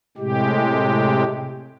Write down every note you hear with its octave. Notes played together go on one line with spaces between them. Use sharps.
A2 C3 G#3 G4